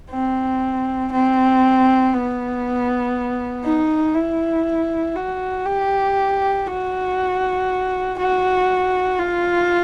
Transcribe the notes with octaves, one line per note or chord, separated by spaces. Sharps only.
C4
C4
B3
D#4
E4
F#4
G4
F#4
F#4
F4